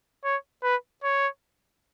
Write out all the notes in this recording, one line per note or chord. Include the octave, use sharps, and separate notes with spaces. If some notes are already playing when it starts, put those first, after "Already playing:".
C#5
B4
C#5